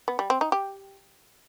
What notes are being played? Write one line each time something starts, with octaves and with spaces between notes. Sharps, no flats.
B3
G3
C4
D#4
G4